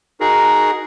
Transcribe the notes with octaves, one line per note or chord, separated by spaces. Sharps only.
D#4 F#4 G#4 A#4